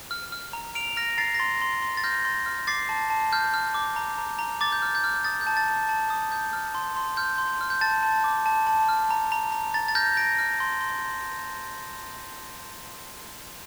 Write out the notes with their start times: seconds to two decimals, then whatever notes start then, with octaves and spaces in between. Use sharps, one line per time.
0.11 F6
0.32 F6
0.53 A#5
0.75 F6 D7 F7
0.96 F6 A#6 D7
1.18 A#5 A6 C7
1.34 A#6
1.39 C6 A6
1.62 C6
1.82 C6
1.97 A6
2.04 F6 G6 A#6
2.25 C6
2.46 F6
2.67 D6 A6 C7
2.89 A5
3.10 A5
3.33 F6 G6
3.54 F6
3.74 D6
3.96 A#5
4.18 A#5
4.39 A#5
4.61 D6 A6
4.72 G6
4.82 F6
4.95 G6
5.04 F6
5.24 D#6 A6
5.41 G6
5.47 A5
5.57 A6
5.68 A5
5.89 A5
6.10 D#6
6.32 G6
6.53 F6
6.75 C6
6.96 C6
7.17 F6 G6
7.38 C6
7.61 F6
7.70 G6
7.81 A5 A6
8.03 A5
8.24 D6
8.46 A5
8.67 A5
8.89 F6
9.11 A#5
9.32 A#5
9.52 A#5
9.74 A#5 A6
9.88 A6
9.95 F6 G6 A#6
10.16 A#5 A#6 D7
10.38 F6
10.60 C6
10.81 C6